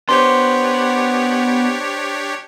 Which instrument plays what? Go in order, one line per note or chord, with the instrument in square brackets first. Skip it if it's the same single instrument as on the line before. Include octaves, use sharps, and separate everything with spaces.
[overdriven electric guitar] B3 [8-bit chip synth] D4 G4 C#5 [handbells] C5 C6